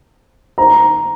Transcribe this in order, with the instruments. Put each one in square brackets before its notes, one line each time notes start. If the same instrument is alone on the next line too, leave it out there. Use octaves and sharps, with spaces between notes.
[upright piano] A#5